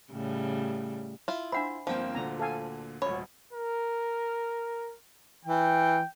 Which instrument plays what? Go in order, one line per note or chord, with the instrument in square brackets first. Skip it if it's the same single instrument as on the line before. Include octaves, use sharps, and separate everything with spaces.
[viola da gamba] A2 C#3 G3
[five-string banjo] E4 F4
[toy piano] D4 F#5 B5 [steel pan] C5 E5
[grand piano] G1 A#3 C4 [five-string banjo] F3 G5
[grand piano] D2 A#2 D3 [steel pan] A#5
[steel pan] A4 F5 G#5
[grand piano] D#1 G#1 D2 [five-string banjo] C#5 [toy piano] B5
[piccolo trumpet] A#4
[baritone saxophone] E3 [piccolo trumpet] G5